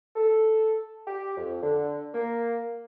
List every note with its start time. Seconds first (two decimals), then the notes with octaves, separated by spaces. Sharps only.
0.16 A4
1.07 G4
1.37 F2
1.63 D3
2.14 A#3